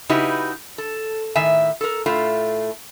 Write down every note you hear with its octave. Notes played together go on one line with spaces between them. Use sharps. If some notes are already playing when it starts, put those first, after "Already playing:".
C#3 D#4 E4 F#4 G4 B4
A4
A2 D#3 E5 G#5
A4 A#4
A2 A3 F4